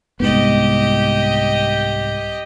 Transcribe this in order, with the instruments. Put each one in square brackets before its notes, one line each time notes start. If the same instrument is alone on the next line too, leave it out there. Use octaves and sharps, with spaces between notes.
[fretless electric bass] C2 G#2 B3 [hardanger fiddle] G4 D#5